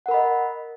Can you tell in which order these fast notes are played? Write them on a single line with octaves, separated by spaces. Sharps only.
F#5 A#4 B5 D#5